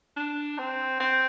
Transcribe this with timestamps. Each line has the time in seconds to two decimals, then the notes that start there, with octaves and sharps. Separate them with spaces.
0.16 D4
0.58 C4
1.00 C4